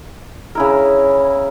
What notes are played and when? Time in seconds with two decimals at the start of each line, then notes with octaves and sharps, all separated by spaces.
0.55 C#3 E4 A#4